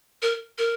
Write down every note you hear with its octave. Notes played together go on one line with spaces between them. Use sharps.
A#4
A#4